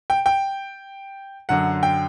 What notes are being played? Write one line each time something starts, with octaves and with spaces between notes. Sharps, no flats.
G5
G5
F#2 D3 F#3 F#5
G5